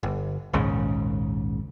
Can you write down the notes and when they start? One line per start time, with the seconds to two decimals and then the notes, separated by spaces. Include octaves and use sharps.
0.03 G1
0.53 A#1 D#2 G#2 C#3